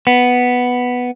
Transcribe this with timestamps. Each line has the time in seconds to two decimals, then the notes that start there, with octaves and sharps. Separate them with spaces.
0.07 B3